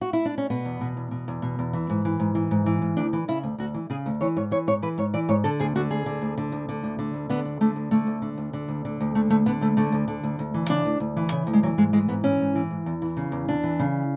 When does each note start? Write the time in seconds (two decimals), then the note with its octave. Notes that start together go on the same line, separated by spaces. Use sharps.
0.01 F#4
0.13 E4
0.25 D4
0.38 C#4
0.50 B2 B3
0.65 E2
0.81 B2
0.97 E2
1.11 B2
1.28 E2
1.42 B2
1.59 E2
1.73 E3
1.90 G#2
2.05 E3
2.20 G#2
2.35 E3
2.51 G#2
2.66 E3
2.82 G#2
2.97 D2 D4
3.13 E3
3.28 C#3 E4
3.43 D2
3.58 D2 F#4
3.74 E3
3.90 C#3 G#4
4.06 D2
4.21 E3 C#5
4.37 G#2 C#5
4.51 E3 C#5
4.67 G#2 C#5
4.82 E3 B4
4.98 G#2 C#5
5.14 E3 D5
5.29 G#2 C#5
5.44 D3 A4
5.60 D2 G#4
5.76 D3 F#4
5.91 D2 G#4
6.06 D3
6.22 D2
6.38 D3
6.52 D2
6.69 D3
6.83 D2
6.99 D3
7.14 D2
7.29 D3 B3
7.45 D2
7.61 D3 A3
7.76 D2
7.91 D3 A3
8.07 D2
8.22 D3
8.38 D2
8.53 D3
8.68 D2
8.85 D3
9.00 D2
9.15 D3 A3
9.30 D2 A3
9.46 D3 B3
9.61 D2 A3
9.77 D3 A3
9.92 D2
10.08 D3
10.23 D2
10.39 D2
10.54 E3
10.69 C#3 D4
10.85 D2
11.00 D2
11.17 E3
11.32 C#3
11.47 D2
11.53 G#3
11.63 E3 F#3
11.78 G#2 G#3
11.93 E3 G#3
12.08 G#2 B3
12.24 E3 C#4
12.40 G#2
12.55 E3
12.71 G#2
12.86 E2
13.02 E3
13.17 C#3
13.32 E2
13.48 E2 D4
13.64 E3
13.79 C#3